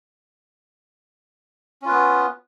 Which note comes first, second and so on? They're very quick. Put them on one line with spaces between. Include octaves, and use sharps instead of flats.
C#4 F4 B4 B3